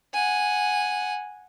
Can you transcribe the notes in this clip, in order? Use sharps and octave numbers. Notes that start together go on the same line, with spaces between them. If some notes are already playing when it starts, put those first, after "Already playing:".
F#5 G#5